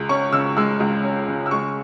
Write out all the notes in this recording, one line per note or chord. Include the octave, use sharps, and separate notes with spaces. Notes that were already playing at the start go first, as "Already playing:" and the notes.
Already playing: C#2 G#3
C#4 C#6
C#3 E6
G#3 E6
C#2
C#4
C#3
E6
G#3 C#6